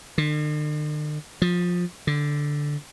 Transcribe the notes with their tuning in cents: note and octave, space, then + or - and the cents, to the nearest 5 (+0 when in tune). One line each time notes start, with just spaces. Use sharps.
D3 +45
F3 +20
D3 +0